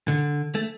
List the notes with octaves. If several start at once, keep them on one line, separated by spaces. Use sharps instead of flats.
D3
A3